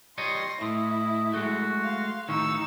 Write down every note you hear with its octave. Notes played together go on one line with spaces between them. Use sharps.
G3 C#5 D#5 C6 A#6
A2 E4 D#5
G#3 A3 F#4
F5 C6
A2 D#3 D#4 C#6 E6